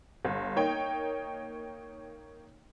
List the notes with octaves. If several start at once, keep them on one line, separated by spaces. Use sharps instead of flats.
G1
A#3 D#4 C#5 G5